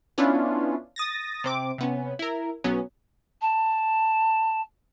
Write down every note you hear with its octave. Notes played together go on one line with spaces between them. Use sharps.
B3 C#4 D4 E4 F4
D#6 A6 A#6
C3 C4 D6
C3 B3 C#4
E4 A#4
B1 F#3 B3 C#4
A5